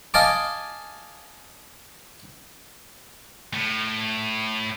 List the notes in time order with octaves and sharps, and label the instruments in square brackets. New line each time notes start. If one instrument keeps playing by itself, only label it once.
[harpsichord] D#5 F5 G#5 A5 D6
[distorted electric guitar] A2